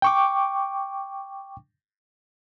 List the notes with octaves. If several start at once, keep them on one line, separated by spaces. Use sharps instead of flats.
G5 C#6 D6